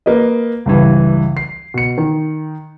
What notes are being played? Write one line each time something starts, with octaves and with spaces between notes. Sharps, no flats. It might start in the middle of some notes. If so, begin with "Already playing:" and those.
A#3 B4 D#5
C#2 G2 E3
C7
B2 C#7
D#3